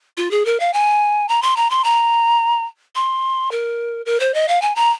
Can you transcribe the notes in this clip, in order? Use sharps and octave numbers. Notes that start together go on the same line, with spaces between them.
F4
G#4
A#4
F5
G#5
A#5
C6
A#5
C6
A#5
C6
A#4
A#4
C5
D#5
F5
G#5
A#5